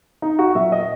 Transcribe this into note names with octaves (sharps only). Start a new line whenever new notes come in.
D#4
F#4
A#2 F#3 E5
D#5